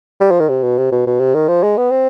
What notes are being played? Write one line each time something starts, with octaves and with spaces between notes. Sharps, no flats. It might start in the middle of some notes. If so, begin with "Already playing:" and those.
G3
F3
D#3
C3
B2
C3
B2
B2
C3
D#3
F3
G#3
B3
C4